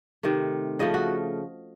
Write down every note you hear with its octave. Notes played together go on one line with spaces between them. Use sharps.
C3 D#3 A3
C#3 F3 A3 D#5
F#4